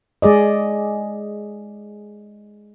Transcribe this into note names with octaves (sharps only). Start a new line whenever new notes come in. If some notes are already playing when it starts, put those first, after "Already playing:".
G#3 G#4 D5 D#5